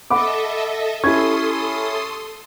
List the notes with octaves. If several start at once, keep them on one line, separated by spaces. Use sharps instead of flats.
A4 D#5 E5 F#5 B5 D6
C#4 E4 G4 A4 C6 C#6 D#6 G#6